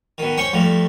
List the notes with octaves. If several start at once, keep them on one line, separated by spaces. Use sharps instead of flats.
B2 D#3
C#4 C5 G5 C#6
G2 F3 A3